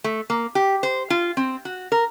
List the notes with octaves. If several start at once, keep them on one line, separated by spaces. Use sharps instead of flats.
A3
A#3
G4
C5
F4
C4
F#4
A#4